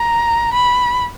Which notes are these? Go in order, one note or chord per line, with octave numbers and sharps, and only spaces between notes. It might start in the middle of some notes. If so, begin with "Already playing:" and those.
Already playing: A#5
B5